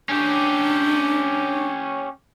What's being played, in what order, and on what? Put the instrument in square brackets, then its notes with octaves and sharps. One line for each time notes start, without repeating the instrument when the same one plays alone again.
[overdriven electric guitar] C#4 G4 [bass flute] D4